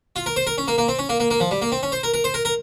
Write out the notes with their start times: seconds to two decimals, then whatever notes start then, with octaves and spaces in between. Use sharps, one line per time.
0.16 F4
0.26 A#4
0.36 C5
0.47 A#4
0.58 C#4
0.68 A#3
0.78 A#3
0.88 C4
0.99 C#4
1.09 A#3
1.20 A#3
1.31 A#3
1.40 F3
1.51 G3
1.62 A#3
1.72 C4
1.83 C#4
1.92 C5
2.03 A#4
2.14 A#4
2.24 C5
2.34 A#4
2.45 A#4